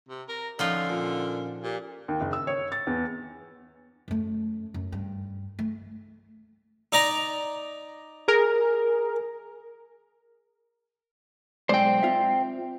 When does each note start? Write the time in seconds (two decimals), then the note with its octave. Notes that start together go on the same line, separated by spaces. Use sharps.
0.09 C3
0.29 A#4 A#5
0.59 D3 F3 C#4 D#4 F4 C#5 F#5 A#5
0.89 A#2
1.63 A#2 G4
2.08 D#2
2.21 F#1
2.33 E6
2.47 C#5
2.72 A6
2.87 E2
4.08 F#2 A3
4.74 F#2
4.92 G2
5.59 A3
6.92 D#4 D5 A#5
8.28 G#4 A#4
11.69 B1 G#3 C5 D5 G5
12.03 C4 F4 E5